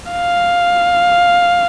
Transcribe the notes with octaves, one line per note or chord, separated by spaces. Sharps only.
F5